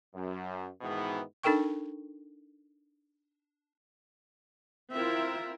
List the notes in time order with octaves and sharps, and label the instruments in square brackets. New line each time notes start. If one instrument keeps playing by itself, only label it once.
[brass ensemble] F#2
G#2 B2 D#3 E3 B3
[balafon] D4 D#4 A4 A#4 G5 C#6
[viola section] C4 E4 A#4 [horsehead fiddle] F4 E5